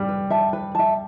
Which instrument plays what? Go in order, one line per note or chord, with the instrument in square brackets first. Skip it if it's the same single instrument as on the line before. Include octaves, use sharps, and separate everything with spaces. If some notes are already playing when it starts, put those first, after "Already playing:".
Already playing: [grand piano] G3
[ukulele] B4
E5 A5
B4
E5 A5